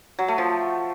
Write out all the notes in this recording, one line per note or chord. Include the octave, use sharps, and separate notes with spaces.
F#3
A3
F3